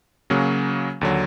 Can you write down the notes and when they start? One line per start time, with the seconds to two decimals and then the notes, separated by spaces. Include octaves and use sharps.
0.30 C#3 F#3 A#3 C#4 F#4
1.01 D#2 D3 F#3